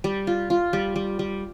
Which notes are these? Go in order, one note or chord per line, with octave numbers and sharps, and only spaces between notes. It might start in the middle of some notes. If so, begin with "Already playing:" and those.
G3
F4
F4
G3
G3
G3